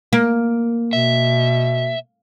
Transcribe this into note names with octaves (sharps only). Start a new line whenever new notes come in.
A#3
B2 E5